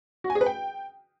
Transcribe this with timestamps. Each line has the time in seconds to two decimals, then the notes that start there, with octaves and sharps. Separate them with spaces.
0.24 F#4
0.30 G#5
0.35 G#4
0.41 B4
0.46 G5